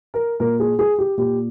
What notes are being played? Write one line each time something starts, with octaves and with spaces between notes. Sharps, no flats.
A#4
A#2 A#4
G#4
G#4
G4
A#2 G4